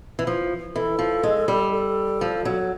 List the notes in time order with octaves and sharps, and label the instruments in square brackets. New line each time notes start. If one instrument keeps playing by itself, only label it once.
[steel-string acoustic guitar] E3
F3
[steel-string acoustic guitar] E3 [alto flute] A4
[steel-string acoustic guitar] F3
G#3
G3
[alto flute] A4
[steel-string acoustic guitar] F3
F#3